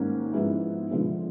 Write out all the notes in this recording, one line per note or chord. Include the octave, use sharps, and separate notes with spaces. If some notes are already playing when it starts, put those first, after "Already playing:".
Already playing: G#2 D#3 G3 A#3 C#4
G#2 F3 G#3 B3 E4
D3 F3 G#3 B3